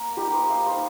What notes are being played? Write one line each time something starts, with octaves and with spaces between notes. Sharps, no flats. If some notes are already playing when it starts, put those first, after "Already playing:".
Already playing: A#3 A#4
G3 D#4 G4
C5
F5
G3 D#4 C5